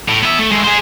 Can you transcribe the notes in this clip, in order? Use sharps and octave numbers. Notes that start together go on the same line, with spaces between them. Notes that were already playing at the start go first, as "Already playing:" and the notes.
A2
B3 E5
A3
G#3 A3
G#4 C5